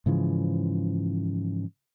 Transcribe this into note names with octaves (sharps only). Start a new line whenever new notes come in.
G#2 C#3 E3 F3